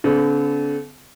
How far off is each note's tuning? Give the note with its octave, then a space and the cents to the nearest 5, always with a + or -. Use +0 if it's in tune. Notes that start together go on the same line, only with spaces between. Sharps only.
D3 -40 C4 -45